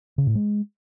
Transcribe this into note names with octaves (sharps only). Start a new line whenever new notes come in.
C#3
A2
G#3